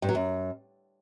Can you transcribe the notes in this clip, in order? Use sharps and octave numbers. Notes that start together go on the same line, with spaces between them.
G2
F#3
F#2